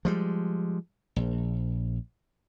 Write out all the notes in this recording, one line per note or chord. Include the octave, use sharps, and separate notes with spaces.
F3 G3 G#3
A#1